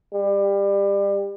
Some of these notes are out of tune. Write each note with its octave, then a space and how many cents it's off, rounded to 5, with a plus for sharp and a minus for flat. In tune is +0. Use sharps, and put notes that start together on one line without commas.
G3 +25